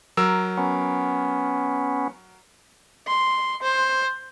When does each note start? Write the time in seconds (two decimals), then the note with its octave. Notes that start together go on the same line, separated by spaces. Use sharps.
0.17 F#3 A#4 E6
0.57 B3 C#4
3.07 C6
3.62 C5